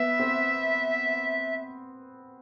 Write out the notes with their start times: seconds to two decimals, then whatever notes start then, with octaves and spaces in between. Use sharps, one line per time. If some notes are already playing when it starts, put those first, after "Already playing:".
Already playing: B3 E5
0.20 C4